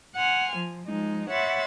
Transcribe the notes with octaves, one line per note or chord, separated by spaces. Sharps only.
F#5 G#5 C6 F6
F3
F3 G#3 D#4
C#5 E5 F#5 B5 C6 A6